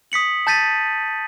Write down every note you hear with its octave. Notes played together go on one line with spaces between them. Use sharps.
D#6 B6 C#7 F#7
A5 G6 A6 B6 D#7